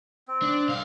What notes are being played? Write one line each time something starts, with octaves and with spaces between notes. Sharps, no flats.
C4
D4
C2 F5